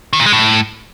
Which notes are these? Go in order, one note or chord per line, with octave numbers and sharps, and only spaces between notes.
D#3
A#2
G#3
A2